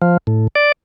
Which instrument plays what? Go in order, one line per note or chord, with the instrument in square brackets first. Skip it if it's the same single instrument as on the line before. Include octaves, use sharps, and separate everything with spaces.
[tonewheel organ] F3
A2
D5